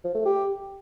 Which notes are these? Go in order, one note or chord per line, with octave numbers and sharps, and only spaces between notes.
F3
A3
G4